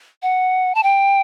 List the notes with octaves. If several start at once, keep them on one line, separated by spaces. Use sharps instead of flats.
F#5
A5
G5